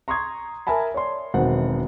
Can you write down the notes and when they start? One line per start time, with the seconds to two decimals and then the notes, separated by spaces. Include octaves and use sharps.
0.08 A#5 C6 C#6 D#6 G#6
0.67 A#4 E5 G#5 A5 B5
0.94 C#5 D5 C6
1.34 E1 D#3 F#3 C4 C5 F#5